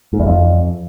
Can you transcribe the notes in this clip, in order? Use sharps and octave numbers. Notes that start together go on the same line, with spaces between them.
G#2
E2
F2